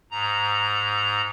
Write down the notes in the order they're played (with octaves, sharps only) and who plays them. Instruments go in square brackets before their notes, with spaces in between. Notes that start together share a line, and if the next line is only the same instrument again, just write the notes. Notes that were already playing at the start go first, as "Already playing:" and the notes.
[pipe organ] G#2 A#5